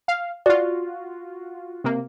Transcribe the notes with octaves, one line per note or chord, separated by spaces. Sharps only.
F5
F4 F#4 D5
C3 A#3